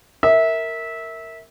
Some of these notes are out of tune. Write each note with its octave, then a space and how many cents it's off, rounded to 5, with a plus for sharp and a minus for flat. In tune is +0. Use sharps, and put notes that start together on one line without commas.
A#4 -15 E5 -20